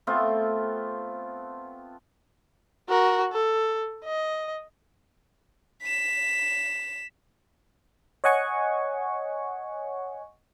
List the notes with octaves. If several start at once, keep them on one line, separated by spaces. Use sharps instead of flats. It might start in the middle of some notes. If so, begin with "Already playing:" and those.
A3 B3 C4 F4
F#4 A#4
A4
D#5
B6 E7
C#5 D#5 F#5 G#5 C#6